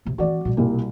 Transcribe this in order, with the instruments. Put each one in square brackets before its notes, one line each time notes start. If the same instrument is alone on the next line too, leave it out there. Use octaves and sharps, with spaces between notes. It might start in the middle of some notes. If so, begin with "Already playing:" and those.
[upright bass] D#2 C3
[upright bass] E3 C4 [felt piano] F#4 D5
[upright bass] B2 G3
[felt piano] C2 A#2 A#3